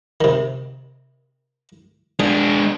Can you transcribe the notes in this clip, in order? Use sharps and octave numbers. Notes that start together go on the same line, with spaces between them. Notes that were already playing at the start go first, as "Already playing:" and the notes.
C3 D#3
G#3 D4 G#4